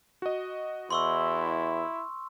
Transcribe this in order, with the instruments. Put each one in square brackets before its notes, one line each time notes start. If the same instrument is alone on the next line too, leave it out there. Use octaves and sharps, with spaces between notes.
[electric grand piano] F#4 D#5
[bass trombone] E2 [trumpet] E4 [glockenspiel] C6 C#6 E6